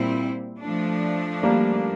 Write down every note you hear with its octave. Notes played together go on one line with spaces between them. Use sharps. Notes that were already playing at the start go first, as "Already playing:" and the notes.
Already playing: A#2 G3 C4 E4
F3 A3 D4
G3 A#3